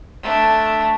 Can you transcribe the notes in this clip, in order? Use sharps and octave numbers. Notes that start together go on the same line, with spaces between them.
A3 D4